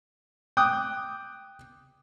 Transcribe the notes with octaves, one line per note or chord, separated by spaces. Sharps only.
G5 D6 D#6 F#6